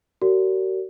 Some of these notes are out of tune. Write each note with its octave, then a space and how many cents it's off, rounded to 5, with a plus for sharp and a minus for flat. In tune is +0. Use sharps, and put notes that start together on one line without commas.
F#4 +40 A#4 -30 D5 -35